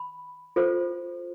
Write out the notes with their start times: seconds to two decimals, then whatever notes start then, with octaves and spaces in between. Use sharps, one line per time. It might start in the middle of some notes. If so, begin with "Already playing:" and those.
Already playing: B5
0.56 F4 A4 C5